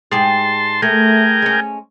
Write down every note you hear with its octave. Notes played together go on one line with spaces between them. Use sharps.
G#2 G4 G#4 A5 C6
A3 G#4 A#4 G5
G#3 C#4